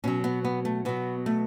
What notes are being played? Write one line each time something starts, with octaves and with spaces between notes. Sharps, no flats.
B2 F#3 C#4
B3
B3
A3
B2 F#3 B3
A3